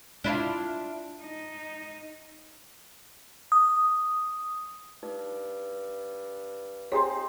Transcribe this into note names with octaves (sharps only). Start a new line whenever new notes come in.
D4 E4 F4
D#4
D#6
G2 D#4
C4 D#4 G4 G#4 C5 C#5 G#5 C6